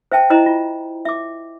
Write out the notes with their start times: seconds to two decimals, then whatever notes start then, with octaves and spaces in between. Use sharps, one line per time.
0.12 C5 E5 G5 A5
0.30 E4 C5 D#5 A#5
0.46 F4
1.05 E5 D6